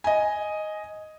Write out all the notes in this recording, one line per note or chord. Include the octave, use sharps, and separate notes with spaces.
D#5 G#5